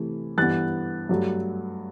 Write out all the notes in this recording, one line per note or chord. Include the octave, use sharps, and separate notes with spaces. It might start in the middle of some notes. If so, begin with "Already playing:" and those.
Already playing: C3 E3 A3
G2 E3 B3 F#6 A6
G2 F#3 A3